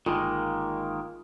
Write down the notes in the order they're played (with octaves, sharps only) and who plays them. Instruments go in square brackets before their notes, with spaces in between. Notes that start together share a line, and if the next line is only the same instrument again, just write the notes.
[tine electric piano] G1 [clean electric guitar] D#3 G#3 A#3 [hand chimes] F4